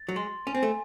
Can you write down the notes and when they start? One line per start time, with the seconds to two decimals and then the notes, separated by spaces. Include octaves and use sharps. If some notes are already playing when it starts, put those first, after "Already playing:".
Already playing: A6
0.08 F#3
0.16 G#3 C6
0.47 C#4 G#5
0.55 C4
0.63 A3